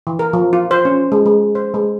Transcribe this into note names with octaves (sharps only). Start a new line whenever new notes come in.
E3
A#4
F3
F4
C5
C#4
G#3
G#3
C5
G#3